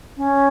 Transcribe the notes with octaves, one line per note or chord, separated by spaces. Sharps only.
C#4